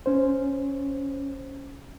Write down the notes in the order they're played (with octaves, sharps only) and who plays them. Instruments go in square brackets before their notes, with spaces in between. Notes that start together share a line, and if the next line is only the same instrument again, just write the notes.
[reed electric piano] C#4 C5